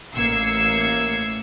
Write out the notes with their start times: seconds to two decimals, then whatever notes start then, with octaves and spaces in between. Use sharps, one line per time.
0.16 A1 A#3 E6 G#6 C7 C#7